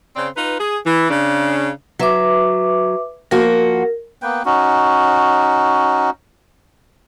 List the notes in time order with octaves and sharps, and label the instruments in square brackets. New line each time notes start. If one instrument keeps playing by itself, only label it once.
[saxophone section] C#3 C4 C5 D5
D#4 F4 B4
G#4
E3
C#3 D4
[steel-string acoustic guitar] F#3 [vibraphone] B4 E5 D6
[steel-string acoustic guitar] F3 A#3 F#4 [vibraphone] A#4
[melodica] A#3 B3 B4 G5
C#4 D#4 F#4